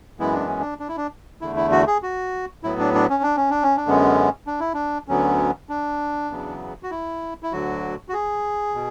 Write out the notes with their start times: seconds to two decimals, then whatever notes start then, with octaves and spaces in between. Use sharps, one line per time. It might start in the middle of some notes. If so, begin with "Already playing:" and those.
0.19 F#2 E3 G#3 B3 E4
0.33 D4
0.47 C#4
0.61 D4
0.80 D4
0.88 E4
0.97 D4
1.41 E2 D3 A3 E4
1.56 E4
1.71 F#4
1.87 G#4
2.03 F#4
2.63 A2 F#3 B3 E4
2.79 D4
2.95 D4
3.10 C#4
3.23 D4
3.37 C#4
3.50 D4
3.63 C#4
3.77 D4
3.86 F#2 D3 G#3 B3 C#4
4.47 D4
4.60 E4
4.74 D4
5.08 D2 D3 F#3 B3 C#4
5.69 D4
6.31 E2 C#3 F#3 B3
6.83 F#4
6.91 E4
7.43 E4
7.52 D2 D3 F#3 F#4
8.09 F#4
8.13 G#4
8.75 B2